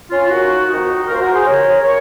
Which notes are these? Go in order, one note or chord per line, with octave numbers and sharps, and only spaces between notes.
C#4 F4
D#2 C#3 D#4 F#4
F2 D#3 D#4 F#4
C2 A#2 F#4 A#4
C5
F#4 A#4
G#4 C5
D#2 C#3 A#4 C#5
C#3 A#4 C#5